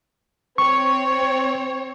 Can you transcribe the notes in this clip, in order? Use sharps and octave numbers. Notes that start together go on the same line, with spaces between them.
C4 C#5 C#6